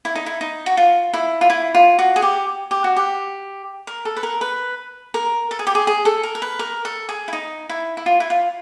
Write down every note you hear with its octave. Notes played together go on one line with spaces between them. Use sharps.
E4
D#4
E4
D#4
F#4
F4
E4
F4
E4
F4
F#4
G#4
G4
G4
F#4
G4
A#4
A4
B4
A#4
B4
A#4
A4
G#4
G4
G#4
G#4
A4
A#4
A#4
B4
A#4
A4
G#4
E4
D#4
E4
E4
F4
E4
F4